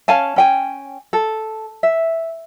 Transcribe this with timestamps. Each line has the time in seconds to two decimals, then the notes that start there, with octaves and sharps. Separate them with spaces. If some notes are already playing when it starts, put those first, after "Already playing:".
0.08 C#4 F5 G#5 A5
0.36 C#4 G5 G#5
1.13 A4
1.83 E5